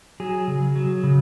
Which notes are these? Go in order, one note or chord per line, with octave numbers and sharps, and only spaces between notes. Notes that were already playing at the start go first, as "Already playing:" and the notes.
F#3 G#4
C#3
F#3
C#3